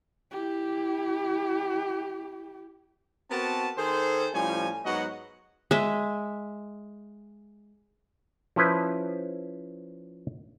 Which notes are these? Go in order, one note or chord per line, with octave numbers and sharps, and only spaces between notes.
E4 G4
B3 C4 F#4 A#4 A5
D#3 G#4 A4 C5
A2 F3 G3 C#4 G#5
G#2 F#3 B3 F#4 D#5 F#5
G#3 E5
F3 C#4 E4 B4 C5